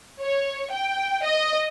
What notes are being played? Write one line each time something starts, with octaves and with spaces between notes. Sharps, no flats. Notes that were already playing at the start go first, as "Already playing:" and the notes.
C#5
G5
D#5